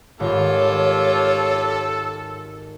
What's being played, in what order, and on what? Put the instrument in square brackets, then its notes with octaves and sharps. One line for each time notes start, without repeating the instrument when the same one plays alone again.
[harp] G#1 [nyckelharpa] F4 G4 [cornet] A4 [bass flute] C#5